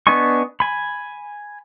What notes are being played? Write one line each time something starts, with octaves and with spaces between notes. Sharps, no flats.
B3 D4 D#5 G#5 C#6
G#5 B5